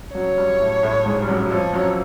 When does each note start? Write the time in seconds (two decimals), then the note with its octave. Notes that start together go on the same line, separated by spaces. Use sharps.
0.15 F#2 F#3 C#5
0.37 G2 G3
0.60 A2 A3
0.82 A2 A3
1.06 G#2 G#3
1.22 G3
1.28 F#2 F#3
1.46 F#3
1.50 F2 F3 C#5
1.73 F#2 F#3